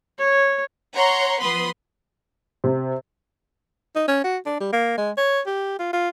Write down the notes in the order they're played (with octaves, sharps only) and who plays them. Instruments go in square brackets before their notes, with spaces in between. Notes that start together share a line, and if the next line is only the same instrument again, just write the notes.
[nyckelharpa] C#5
[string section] C#5 F#5 A#5 C6 C#6
F3 B3 B4 B5 C6 D#6
[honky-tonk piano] C3
[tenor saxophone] D#4
C#4
F#4
D4
G3
A#3
G#3
C#5
G4
F4
F4